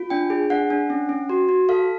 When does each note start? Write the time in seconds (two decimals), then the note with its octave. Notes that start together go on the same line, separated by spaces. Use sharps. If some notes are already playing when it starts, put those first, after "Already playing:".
Already playing: F4
0.10 D4 G5
0.30 G#4
0.50 D4 F#5
0.70 D4
0.90 C#4
1.09 C#4
1.30 F#4
1.49 F#4
1.69 A4 F5